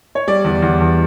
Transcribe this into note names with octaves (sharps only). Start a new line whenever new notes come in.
C#5
G3 D5
E2
E2
E2